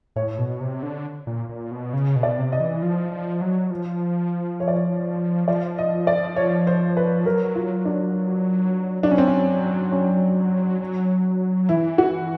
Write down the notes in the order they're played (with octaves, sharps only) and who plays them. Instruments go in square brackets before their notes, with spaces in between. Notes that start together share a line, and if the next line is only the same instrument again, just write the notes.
[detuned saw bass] A2 [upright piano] C#5
[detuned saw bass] B2
C3
D3
A#2
A#2
B2
C#3
B2
[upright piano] D5
[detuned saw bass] C3
[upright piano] D#5
[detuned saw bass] E3
F3
F3
F#3
F3
[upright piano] C#5
D5
C#5
[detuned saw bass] F3 [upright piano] D5
[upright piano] D#5
D5
C#5
C5
B4
[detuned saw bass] F#3 [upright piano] A#4
[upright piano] F4
D4
[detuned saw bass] F#3 [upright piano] D4
[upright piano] C#4
C4
C#4
C#4
[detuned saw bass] F#3
[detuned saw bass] E3 [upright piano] E4
[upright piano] F#4